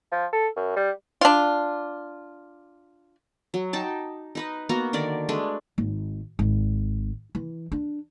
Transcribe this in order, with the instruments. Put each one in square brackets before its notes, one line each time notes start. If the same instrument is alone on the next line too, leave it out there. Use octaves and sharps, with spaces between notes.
[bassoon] F3
A4
F#2
G3
[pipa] D4 F4
[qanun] F#3
D#4 G5 A5 D6
D#4 B4 D#5
A#3 B3 F#4 A#5
D3 D#3 A#4 D5
G#3 A3 D4 B4
[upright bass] G#1
G#1
E3
D4